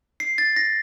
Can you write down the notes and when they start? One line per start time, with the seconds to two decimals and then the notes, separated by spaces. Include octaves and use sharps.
0.20 C7
0.38 A6
0.56 A#6